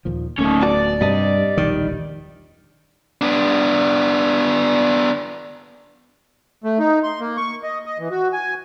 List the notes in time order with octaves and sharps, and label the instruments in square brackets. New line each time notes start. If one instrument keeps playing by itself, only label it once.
[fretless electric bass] D#2 A#2 F3
[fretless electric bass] D1 A3 A#3 [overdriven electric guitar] C#4 D#4
[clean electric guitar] B3 F#4 A5 [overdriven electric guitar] D5
[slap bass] G2 [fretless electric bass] C3 [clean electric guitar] G3 D#5 A5
[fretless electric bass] E1 A#1 D#2 [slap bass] D#3
[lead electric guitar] B3 D4
[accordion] A3
D#4
C6
A#3
C#6
D#5
D#5
E3
F#4
G#5